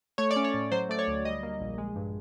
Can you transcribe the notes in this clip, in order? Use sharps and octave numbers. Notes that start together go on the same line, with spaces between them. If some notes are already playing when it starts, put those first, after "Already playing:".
A3 C#5
D5
C#4
C#5
A2
F#3 C5
A3 D5
C#5
D2
G3 D#5
A#3
A#1
G#3
G2